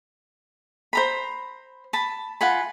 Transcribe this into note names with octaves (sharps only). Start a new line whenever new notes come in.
C5 A#5 B5
A5 B5
F4 F#5 G#5 B5